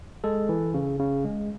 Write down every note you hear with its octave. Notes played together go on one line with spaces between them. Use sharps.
G#3 A4
E3
C#3
C#3
G#3